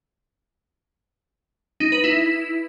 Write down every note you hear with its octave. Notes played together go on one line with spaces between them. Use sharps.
D#4
B4
E4